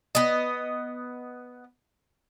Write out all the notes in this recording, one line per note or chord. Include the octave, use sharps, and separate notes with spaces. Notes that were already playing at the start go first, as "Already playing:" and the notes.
B3 D#5